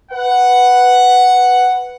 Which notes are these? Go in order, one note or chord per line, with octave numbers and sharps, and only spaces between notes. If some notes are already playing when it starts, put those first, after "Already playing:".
B4 F#5